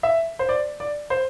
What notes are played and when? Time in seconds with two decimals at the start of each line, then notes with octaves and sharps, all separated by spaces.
0.03 E5
0.39 C5
0.49 D5
0.80 D5
1.10 C5